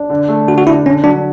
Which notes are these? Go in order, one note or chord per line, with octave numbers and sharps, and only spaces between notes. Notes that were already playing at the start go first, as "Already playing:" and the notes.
Already playing: D4
D3
A3
D3 F#4
F#4
D4 E4
D3 C#4
F#3 D4